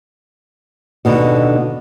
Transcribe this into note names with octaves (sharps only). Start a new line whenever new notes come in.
D#2 B2 D3